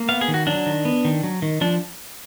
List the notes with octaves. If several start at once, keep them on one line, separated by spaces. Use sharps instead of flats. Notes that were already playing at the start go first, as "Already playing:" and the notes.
Already playing: A#3
B3 F5
G#4
D#3
F#4
F#3 D4
D#3
B3
D#3
F#3
D#3
F3 D4